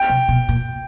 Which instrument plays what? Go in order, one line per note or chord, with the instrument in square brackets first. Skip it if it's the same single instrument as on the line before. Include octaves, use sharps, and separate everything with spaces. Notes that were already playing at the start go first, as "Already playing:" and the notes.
Already playing: [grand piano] G5
[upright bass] C3
B2
A#2